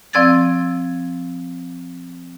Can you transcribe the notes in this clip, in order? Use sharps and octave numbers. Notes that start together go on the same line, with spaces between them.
F3 C4 D5 E6 G#6 A6